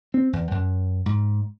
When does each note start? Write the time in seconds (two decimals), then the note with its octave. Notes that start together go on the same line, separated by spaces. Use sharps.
0.14 C4
0.33 E2
0.51 F#2
1.06 G#2